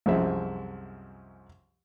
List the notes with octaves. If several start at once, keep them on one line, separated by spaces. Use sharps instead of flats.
C2 F#2 F3 G#3 E5